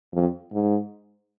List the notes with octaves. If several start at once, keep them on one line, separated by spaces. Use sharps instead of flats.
F2
G#2